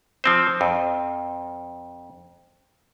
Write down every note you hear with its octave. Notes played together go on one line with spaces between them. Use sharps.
F3 C4 C5
F2